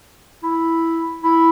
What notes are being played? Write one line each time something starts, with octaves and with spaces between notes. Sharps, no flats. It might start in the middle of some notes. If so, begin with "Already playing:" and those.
E4
E4